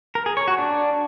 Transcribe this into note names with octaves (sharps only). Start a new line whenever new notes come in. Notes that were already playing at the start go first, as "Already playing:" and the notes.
A#4
G#4
C#5
F#4
D4